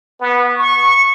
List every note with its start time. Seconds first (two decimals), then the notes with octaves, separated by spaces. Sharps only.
0.20 B3
0.55 C#6